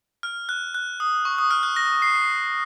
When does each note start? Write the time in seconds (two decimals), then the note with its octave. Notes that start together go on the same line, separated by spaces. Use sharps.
0.23 F6
0.49 F#6
0.75 F#6
1.00 D#6
1.25 C#6
1.38 D#6
1.51 F6
1.63 F#6
1.76 A#6
2.02 C7